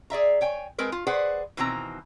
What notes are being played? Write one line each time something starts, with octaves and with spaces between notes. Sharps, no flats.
G#4 D5 E5 A#5
C#5 G5 G#5
G#3 C4 A#4 B4
F4
G#4 B4 C5 D5 F#5
B2 D#3 E3 C4 B4 A#5